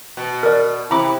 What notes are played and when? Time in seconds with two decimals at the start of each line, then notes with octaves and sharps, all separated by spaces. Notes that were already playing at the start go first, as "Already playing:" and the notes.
0.17 B2
0.43 A#4 D5
0.91 C3 E4 A#5 B5 D6